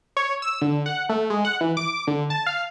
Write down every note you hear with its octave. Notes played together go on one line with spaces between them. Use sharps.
C#5
E6
D3
F#5
A3
G#3
F#5
E3
D6
D3
A5
F5